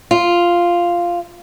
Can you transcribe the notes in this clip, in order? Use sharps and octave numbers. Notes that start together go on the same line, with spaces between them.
F4